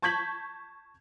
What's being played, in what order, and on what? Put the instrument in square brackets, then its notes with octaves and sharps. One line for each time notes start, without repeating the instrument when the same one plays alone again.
[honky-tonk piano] A5 C#6 G6 G#6 B6 F#7